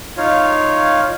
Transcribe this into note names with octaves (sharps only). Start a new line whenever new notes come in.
D#4 F4 C#5 F5